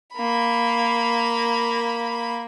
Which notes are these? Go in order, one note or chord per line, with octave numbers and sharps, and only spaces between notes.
A#3 B5